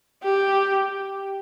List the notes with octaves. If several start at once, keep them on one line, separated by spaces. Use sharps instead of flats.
G4